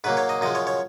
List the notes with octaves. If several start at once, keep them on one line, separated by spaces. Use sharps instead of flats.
G#2 F#3 A#3 B4
C#5
D#5
F#2 F3 G#3 D#5
C#5
C#5